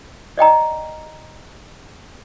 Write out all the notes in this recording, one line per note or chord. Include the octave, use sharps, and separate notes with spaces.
D5 D#5 G5 A#5